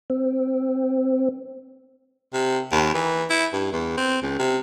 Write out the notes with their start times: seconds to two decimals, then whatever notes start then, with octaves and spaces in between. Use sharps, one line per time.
0.10 C4
2.33 C3
2.72 D#2
2.94 E3
3.30 E4
3.53 G2
3.72 E2
3.97 C4
4.22 C#2
4.39 C3